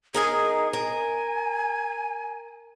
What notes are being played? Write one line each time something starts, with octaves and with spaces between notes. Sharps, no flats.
D#4 G#4 A#4 G#5
A#4 G#5